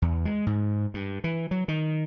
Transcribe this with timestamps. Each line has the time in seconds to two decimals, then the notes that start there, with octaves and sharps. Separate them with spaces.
0.02 E2
0.25 G#3
0.47 G#2
0.94 G2
1.24 E3
1.51 F#3
1.68 D#3